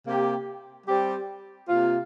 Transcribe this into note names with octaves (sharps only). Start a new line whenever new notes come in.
C3 A#3 G4
G3 C4 G4
C3 A#3 F4